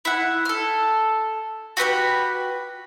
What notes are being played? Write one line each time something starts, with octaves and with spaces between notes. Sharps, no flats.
E4 F#5
A4 F6
F#4 G4 B4 B5